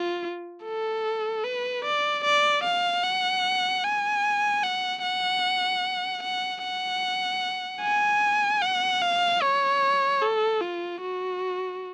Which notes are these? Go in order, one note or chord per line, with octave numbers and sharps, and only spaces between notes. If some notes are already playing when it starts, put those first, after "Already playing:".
Already playing: F4
A4
B4
D5
D5
F5
F#5
G#5
F#5
F#5
F#5
F#5
G#5
F#5
F5
C#5
A4
F4
F#4